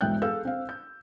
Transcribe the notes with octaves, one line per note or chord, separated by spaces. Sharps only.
E1 G#2 E5 G5 F#6 G6
G#4 A4 F5 E6 G6
C4 F5
G6